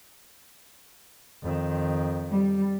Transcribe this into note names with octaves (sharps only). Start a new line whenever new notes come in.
F2 D#3
G3